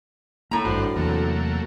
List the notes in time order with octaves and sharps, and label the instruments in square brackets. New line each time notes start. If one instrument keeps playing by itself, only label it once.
[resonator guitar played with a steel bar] A2 A#5 [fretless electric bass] A#3
[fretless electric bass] G#1 G2 [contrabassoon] D2 [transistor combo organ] D4 C5 F#5
[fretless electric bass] E2 C3 [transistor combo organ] F#3 A3 A#3